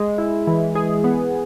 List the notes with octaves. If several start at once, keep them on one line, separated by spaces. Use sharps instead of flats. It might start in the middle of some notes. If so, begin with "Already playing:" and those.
Already playing: G#3
E4
E3
G#4
B3